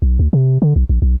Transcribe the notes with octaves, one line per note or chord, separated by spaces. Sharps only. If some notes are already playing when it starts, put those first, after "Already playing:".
B1
D2
C3
D3
B1
A#1
B1